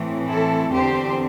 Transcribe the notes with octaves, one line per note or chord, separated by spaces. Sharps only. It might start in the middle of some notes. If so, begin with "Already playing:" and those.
Already playing: A2 E3 C4
E4 A4
E2 D3 C4 G4 C5